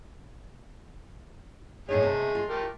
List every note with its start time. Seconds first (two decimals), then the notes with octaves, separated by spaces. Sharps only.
1.89 A2 G#3 A3 D#4 G#4 C#5
2.02 C3 A5
2.35 F4
2.49 A3 G4 A#4